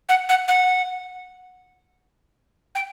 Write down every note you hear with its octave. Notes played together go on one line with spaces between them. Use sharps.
F#5
F#5
F#5
G5